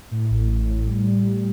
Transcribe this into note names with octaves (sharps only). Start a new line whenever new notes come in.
A2
A1
A2
A2
G3